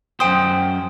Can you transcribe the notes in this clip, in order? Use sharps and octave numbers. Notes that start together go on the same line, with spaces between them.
F#2 C5 G5 D#6